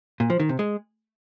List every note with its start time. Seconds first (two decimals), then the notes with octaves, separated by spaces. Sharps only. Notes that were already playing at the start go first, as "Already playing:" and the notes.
0.20 A#2
0.30 F3
0.40 D#3
0.49 C3
0.59 G#3